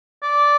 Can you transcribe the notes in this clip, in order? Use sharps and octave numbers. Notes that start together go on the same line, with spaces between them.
D5